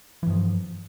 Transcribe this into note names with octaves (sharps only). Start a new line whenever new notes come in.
G2 E3 F3